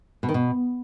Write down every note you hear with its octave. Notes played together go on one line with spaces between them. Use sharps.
B2
D#3
B2